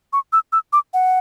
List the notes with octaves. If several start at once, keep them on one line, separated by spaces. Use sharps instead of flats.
C#6
E6
E6
D6
F#5